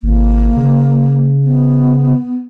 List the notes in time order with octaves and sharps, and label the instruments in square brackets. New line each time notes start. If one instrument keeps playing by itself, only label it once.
[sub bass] G#1 [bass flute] A#3
[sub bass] C#3
[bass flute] B3